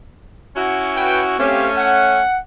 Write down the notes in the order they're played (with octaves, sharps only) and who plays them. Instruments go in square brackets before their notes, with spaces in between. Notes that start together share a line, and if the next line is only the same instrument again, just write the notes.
[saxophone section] C#4 E4 F#4
[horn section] B4 G5
[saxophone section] A3 C#4 [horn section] C4 G4 F5
[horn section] F#5